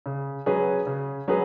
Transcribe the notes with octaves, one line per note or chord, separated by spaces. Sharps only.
C#3
F#3 C#4 G#4 B4
C#3
F#3 C#4 G#4 B4